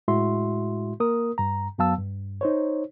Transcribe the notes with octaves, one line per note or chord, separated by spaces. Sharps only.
A2 G#3 E4 F#4 E5 C6
A#3 A#4 D#6
G2 A#5
F#2 F#3 B3 F5 A5 E6
G2
D#4 C5 C#5